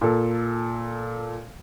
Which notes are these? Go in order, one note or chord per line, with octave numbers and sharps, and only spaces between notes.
A#2 A4